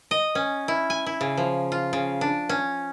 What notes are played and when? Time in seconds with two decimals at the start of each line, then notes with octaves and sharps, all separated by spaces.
0.11 D#5
0.35 C#4
0.68 E4
0.90 G#5
1.06 E4
1.21 C#3
1.37 F3
1.72 F4
1.93 C#3
2.21 D4
2.49 C#4